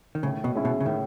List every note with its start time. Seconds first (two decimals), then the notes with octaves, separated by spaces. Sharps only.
0.15 D#3
0.23 A2 C#3
0.44 B2
0.55 G#3 C#4 E4
0.65 B2
0.80 C#3
0.85 A2 D#3